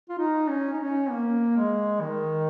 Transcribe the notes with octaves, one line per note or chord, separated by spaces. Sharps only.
F4
D#4
C#4
D#4
C#4
A#3
G#3
D#3